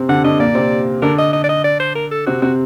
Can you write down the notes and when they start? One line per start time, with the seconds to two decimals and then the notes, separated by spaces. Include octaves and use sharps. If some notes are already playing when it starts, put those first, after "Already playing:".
Already playing: C3 C4
0.09 D3 D4 F#5
0.24 D3 D4 D#5
0.39 A#2 A#3 D5
0.55 C3 C4
1.02 D3 D4 A#4
1.18 D#5
1.33 D#5
1.44 D5
1.49 D#5
1.64 D5
1.80 C5
1.96 A#4
2.11 A4
2.27 C3 C4 F#4
2.42 C3 C4 F#4